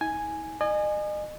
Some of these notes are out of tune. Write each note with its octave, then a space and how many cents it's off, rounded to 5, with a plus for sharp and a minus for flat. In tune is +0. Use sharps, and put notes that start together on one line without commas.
D#4 +45 G#5 +0
D#5 -40 G#5 +0